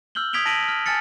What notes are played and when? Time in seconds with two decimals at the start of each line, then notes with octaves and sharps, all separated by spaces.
0.15 E6 F6 G6 F#7 G7
0.33 D#6 G#6 B6 D7 F7 G7
0.46 A5 A#6 B6 D7 D#7 F#7
0.68 F6
0.86 G#5 A5 F6 A6 C#7